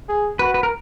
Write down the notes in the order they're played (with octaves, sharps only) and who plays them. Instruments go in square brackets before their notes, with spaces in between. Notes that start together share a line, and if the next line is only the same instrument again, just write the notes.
[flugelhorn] G#4
[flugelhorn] F#4 [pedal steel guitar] B4
[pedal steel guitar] B4
A#4